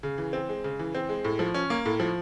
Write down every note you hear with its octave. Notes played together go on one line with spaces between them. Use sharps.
C#3
E3
C4
G#3
C#3
E3
C4
G#3
A2
F3
C#4
A#3
A2
F3